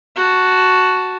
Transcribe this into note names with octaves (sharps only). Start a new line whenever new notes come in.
F#4 A5